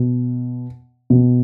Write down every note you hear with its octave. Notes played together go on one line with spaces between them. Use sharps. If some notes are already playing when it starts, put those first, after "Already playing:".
Already playing: B2
B2